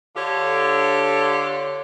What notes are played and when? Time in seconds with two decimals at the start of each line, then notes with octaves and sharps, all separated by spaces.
0.16 D3 D4 F4 G4 A4 C#5